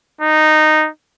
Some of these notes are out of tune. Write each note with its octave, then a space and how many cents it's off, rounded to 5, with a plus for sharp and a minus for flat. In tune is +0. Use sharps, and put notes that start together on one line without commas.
D#4 -10